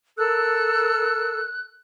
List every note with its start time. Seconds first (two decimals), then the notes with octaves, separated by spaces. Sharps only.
0.18 A4 A#4 E6 F#6